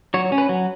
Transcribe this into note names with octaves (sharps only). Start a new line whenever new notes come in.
F#3 C#5
C#4
B4
F#3